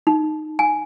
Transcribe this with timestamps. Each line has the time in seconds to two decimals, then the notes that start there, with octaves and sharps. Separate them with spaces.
0.07 D#4
0.59 G#5